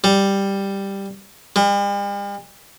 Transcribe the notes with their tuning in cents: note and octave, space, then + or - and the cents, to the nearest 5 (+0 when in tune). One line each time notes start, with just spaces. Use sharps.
G3 +5
G3 +45